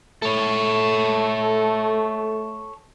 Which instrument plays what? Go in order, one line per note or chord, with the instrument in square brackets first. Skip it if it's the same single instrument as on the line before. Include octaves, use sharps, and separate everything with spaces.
[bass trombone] A3 [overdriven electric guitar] A4 C#5